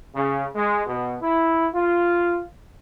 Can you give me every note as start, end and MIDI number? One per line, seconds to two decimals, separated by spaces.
0.15 0.47 49
0.55 0.83 56
0.87 1.16 47
1.21 1.68 64
1.75 2.40 65